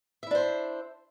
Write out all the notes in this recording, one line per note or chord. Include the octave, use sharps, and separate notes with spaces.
D4 E4 C5 E5